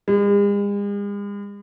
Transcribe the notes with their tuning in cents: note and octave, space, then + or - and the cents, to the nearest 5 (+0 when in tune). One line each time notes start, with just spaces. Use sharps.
G#3 -45